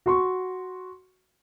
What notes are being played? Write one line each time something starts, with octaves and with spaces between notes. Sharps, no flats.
F#4 C6 C#6